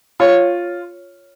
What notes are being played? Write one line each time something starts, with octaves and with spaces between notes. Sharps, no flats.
F4 C#5